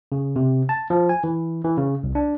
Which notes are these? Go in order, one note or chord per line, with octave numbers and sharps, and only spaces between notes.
C#3
C3
A5
F3
G#5
E3
E3
C#3
C2
D4